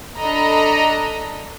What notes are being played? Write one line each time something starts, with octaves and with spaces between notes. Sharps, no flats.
D4 A4 D#5 A#5 B5